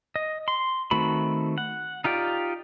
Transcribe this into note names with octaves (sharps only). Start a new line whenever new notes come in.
D#5
C6
D#3 A3 C4 F#4 B5
F#5
D#4 F4 G4 D5